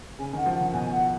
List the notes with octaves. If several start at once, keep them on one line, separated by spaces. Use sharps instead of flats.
C#3 G#5
D#3 F#5
F3
F#5
D#3
B2 G#5
F#5